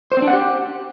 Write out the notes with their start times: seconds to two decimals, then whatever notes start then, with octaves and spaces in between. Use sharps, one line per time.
0.12 C5
0.17 C4
0.22 D4
0.28 F#5
0.33 G4